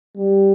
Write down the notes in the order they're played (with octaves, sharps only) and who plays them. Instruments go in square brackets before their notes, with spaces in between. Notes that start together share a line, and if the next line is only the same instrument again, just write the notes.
[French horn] G3